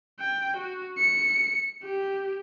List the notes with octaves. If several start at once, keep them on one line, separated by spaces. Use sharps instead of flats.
G5
F#4
C#7
G4